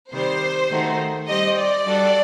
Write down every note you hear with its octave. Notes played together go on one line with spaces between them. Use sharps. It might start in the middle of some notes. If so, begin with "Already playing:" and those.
C3 D#3 G3 C5
D#3 A3 D#4 F#4
G3 C4 G4 D#5
D5
G3 D4 F#4 A4